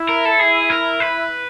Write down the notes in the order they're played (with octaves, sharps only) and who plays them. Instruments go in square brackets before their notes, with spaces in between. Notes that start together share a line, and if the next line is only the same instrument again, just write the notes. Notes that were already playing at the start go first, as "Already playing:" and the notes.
Already playing: [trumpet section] E4
[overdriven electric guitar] A#4
A4
G#4
A#4
B4